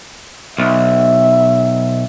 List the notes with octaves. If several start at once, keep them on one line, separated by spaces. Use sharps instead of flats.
B1 E5